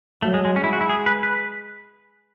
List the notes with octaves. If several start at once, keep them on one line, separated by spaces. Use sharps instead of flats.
F#3 A3
G#3
G#3
G#3 C#4
E4
F#4
E4
G#4
B4
B4